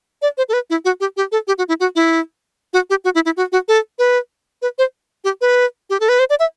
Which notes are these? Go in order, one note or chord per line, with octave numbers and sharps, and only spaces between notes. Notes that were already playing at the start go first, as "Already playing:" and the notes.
D5
C5
A4
B4
E4
F#4
G4
G4
A4
G4
F#4
E4
F#4
E4
F#4
G4
F#4
E4
E4
F#4
F#4
A4
B4
B4
C5
G4
B4
G4
A4
B4
C5
D5
E5